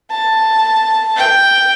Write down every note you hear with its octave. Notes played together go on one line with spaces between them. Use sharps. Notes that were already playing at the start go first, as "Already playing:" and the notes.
A5
G5